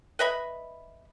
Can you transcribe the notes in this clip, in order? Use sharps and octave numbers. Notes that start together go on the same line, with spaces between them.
B4 D#5 E5 B5